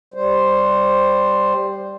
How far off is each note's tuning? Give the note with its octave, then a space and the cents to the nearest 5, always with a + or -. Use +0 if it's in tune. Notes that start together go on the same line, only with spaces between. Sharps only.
G3 +0 C5 +0